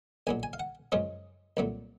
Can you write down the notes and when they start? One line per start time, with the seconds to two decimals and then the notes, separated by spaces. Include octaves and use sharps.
0.27 B1 A#2 F#3 G#5
0.43 G#5
0.53 F5
0.60 F#5
0.92 F#2 C#3 F3 G#3 C#4 D#5
1.57 C2 A#2 F#3 A3